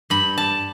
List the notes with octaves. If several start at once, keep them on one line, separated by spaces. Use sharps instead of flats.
G2 B5
A5